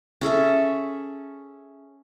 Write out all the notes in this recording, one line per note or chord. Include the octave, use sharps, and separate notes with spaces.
C#4 G#4 A4 E5